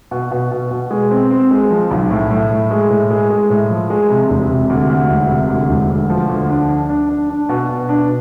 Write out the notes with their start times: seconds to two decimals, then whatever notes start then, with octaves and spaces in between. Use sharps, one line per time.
0.11 B2
0.31 B2
0.51 B2
0.71 B2
0.91 G#3
1.11 C4
1.31 C4
1.51 G#3
1.71 F3
1.91 B1
2.11 A2
2.31 A2
2.51 A2
2.71 G#3
2.90 A2
3.11 G#3
3.30 G#3
3.50 A2
3.70 F3
3.90 G#3
4.10 C3
4.30 E1
4.50 C3
4.70 D2
4.90 D2
5.10 E1
5.29 C3
5.50 D2
5.69 E1
5.90 D2
6.10 F3
6.29 D2
6.49 D4
6.69 D4
6.89 D4
7.09 D4
7.29 D4
7.49 B2
7.69 B2
7.89 D4